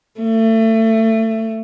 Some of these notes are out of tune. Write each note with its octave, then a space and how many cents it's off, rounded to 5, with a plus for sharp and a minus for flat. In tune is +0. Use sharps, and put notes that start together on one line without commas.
A3 +25